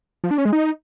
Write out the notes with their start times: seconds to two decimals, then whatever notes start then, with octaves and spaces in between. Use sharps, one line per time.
0.24 F3
0.31 D4
0.38 C#4
0.45 G#3
0.53 D#4